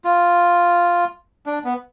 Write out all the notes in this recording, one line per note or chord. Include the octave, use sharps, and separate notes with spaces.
F4
D4
B3